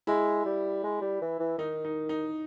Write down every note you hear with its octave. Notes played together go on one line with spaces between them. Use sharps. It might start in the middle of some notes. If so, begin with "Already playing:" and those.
G#3 E4
G3
G#3
G3
E3
E3
D#3 D#4
D#4
D#4